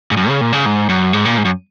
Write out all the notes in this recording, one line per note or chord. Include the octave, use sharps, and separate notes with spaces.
G#2
F#2
C#3
A#2
C#3
G#2
F#2
G#2
A#2
G#2
F#2